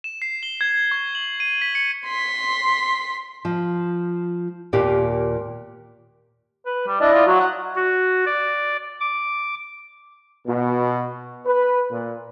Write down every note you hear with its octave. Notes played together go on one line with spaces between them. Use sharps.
E7
C7
G7
G#6
C#6
F#7
D#7
B6
C#7
C6 B6
F3
D#2 A#2 A#3 G4
B4
G3
D4 E4 D5 D#5
F4
F#3 F#4
F#5
F#4
D5
D6
B2
B4
A#2